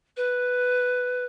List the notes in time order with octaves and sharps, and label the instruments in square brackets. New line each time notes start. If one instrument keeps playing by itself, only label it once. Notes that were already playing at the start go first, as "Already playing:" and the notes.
[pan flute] B4